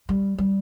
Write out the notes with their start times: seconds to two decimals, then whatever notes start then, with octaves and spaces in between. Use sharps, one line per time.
0.09 G3
0.38 G3